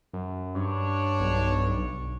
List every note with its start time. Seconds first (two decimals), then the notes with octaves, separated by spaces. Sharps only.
0.13 F#2
0.55 G2 D4 C#5
1.20 B1